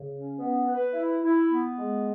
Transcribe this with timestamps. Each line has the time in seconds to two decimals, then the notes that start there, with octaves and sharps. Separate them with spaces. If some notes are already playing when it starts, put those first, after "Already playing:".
Already playing: C#3
0.11 C#4
0.38 B3
0.67 B4
0.94 E4
1.22 E4
1.49 B3
1.77 G#3